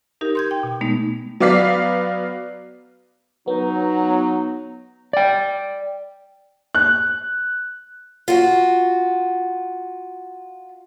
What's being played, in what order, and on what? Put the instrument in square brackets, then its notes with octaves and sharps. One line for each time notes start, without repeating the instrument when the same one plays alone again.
[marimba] D#4 G4 A#4
C6 G6 G#6
G5
B2
G#3 A3 B3 D#4
[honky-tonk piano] F#3 B3 D5 F5 B6 C7
[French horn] F#3 [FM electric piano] B3 [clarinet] D#4
[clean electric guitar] D5 G5
[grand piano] F#6
[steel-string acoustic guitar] F4 F#4